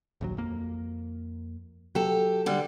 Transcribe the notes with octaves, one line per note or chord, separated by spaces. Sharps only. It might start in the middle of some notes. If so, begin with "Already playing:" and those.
A#1 D#2 F#3
F2 A#3
F#3 G4 A4
D3 G3